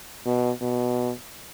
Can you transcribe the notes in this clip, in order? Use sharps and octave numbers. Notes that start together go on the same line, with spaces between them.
B2
B2